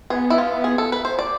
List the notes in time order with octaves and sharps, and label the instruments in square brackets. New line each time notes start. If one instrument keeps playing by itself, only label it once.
[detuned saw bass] B3 [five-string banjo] G#4
[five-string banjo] E4
F4
G#4
A4
B4
C5
D5